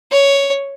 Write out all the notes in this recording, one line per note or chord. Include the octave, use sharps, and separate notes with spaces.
C#5